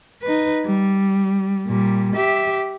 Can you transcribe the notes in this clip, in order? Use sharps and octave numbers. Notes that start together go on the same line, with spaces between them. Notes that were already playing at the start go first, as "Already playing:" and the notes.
D#4 B4
G3
A#2 G3
G4 E5